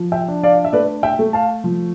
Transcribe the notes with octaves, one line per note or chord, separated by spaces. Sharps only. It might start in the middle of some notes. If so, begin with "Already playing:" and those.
Already playing: F3
E5 G5
D4
D5 F5
E5
A3 B4 D5
E5 G5
A3
F5 A5
F3